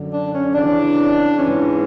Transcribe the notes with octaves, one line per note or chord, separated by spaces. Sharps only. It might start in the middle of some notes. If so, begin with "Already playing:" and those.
Already playing: F#2 D3
D4
C#4
F2 C#3 E3 D4
G#2 E3 C#4